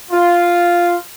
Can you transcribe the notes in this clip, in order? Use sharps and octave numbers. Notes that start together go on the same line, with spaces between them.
F4